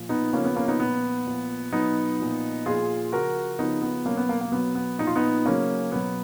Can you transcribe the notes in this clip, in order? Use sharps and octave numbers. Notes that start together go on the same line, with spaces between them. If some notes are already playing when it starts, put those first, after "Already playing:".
Already playing: A#2 F3
B3 D#4
C#3 F3 A#3 C#4
B3
A#3 C#4
B3 D#4
A#2 F3 B3
A#2 F3
B2 F#3 B3 D#4
A#2 F3
A#2 F3 F4 G#4
C#3 F3 F#4 A#4
C#3 F3 B3 D#4
B3
B2 F#3 A#3 C#4
B3
A#3
A#3
B2 F#3 B3
B3
A#2 F3 D#4
F4
B3 D#4
C#3 F#3 A#3 C#4
B2 F#3 B3